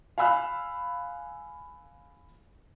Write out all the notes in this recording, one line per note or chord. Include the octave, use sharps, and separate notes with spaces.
F5 G#5 B5 E6 F#6